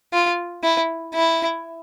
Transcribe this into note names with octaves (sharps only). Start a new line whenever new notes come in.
F4
E4
E4